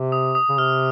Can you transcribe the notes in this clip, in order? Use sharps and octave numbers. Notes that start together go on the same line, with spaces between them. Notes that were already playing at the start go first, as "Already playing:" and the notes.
Already playing: C3
D#6
D#6
C#3
C3 F6